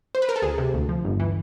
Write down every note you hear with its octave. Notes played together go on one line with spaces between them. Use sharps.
C5
B4
A#4
A4
D2 G#4
C3
D2
F3
G1
E3